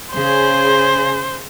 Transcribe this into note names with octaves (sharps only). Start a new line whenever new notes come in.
C#3 G#4 C5